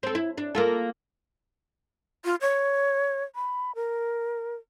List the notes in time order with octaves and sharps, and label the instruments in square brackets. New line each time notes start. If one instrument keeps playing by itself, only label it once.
[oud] C4 A4
E4
D4
A#3 F4 A4
[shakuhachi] F4
C#5
B5
A#4